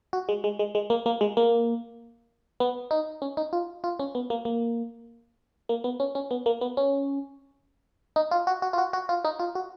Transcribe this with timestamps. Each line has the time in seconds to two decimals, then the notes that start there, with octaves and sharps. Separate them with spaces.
0.13 F#4
0.29 G#3
0.44 G#3
0.59 G#3
0.75 G#3
0.90 A#3
1.06 A#3
1.21 G#3
1.37 A#3
2.60 B3
2.91 D#4
3.22 C#4
3.37 D#4
3.53 F4
3.84 F4
3.99 C#4
4.15 B3
4.30 A#3
4.45 A#3
5.69 A#3
5.84 B3
6.00 C#4
6.15 C#4
6.31 B3
6.46 A#3
6.61 B3
6.77 C#4
8.16 D#4
8.31 F4
8.47 F#4
8.62 F#4
8.73 F4
8.78 F#4
8.93 F#4
9.09 F4
9.25 D#4
9.39 F4
9.55 F#4